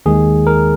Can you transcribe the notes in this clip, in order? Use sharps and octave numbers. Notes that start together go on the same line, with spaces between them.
D#2 D#3 G#3 G#4
A#4